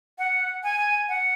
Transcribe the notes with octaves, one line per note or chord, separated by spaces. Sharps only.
F#5
G#5
F#5